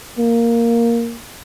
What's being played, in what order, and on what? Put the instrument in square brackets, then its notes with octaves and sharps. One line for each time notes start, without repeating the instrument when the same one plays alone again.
[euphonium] A#3